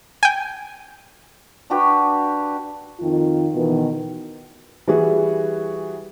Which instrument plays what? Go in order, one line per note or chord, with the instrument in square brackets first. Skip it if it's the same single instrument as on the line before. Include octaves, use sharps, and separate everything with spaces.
[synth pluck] G5 G#5
[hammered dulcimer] D4 F#4 G4 B4
[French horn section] F2 D#3 F4
B2 D#3 E3
[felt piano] E3 G3 F#4 G#4